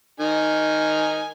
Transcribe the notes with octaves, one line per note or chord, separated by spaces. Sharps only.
D#3 D#4 G#5